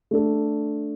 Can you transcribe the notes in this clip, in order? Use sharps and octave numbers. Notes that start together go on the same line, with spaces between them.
A3 D4 A4